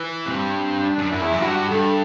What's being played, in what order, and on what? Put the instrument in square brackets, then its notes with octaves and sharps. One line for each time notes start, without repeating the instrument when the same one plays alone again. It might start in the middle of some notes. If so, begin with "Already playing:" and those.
Already playing: [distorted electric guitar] E3
[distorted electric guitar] G2 [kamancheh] C4
[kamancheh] C4
D4
[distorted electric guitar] F#2
[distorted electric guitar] F#2 [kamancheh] E4
[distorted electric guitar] E2
F#2
[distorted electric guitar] G2 [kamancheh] F#4
[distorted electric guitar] G2 [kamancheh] A4